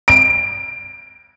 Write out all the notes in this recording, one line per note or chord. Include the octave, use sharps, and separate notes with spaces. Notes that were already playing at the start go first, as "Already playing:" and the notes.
D7